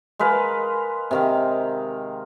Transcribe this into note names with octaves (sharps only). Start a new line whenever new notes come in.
G#3 A#4 B4 F5
C3 D#3 F5